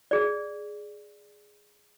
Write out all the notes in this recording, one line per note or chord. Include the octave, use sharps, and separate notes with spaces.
G#4 D5